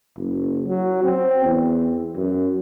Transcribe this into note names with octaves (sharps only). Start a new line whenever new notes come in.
F#1
F#3
C4
E2
F#2